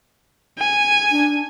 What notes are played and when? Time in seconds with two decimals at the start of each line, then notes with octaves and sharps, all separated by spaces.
0.58 G#5
1.11 D4